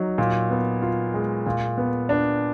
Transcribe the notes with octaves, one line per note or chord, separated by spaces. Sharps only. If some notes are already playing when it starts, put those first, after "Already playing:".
Already playing: F#3 D#4
A#2
B3
F4
G#3
A#2
B3
D4